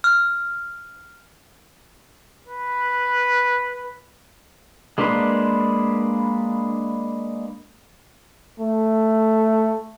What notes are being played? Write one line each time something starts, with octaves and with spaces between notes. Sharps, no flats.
F6
B4
G#3 A#3 D4 B4 C6
A3